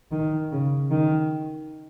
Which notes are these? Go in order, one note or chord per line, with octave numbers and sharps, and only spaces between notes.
D#3
C#3
D#3